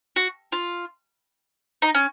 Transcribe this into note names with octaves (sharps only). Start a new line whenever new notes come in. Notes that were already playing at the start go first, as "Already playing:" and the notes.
F#4
F4
D#4
C#4